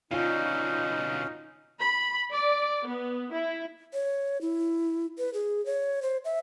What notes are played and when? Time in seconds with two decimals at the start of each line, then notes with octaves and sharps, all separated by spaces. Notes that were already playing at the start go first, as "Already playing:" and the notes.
0.11 B2 D3 C#4 D#4 F4
1.79 B5
2.30 D5
2.84 B3
3.31 E4
3.93 C#5
4.41 E4
5.18 B4
5.34 G#4
5.66 C#5
6.02 C5
6.25 E5